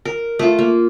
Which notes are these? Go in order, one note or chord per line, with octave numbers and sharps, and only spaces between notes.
A#4
A3 F4
A#3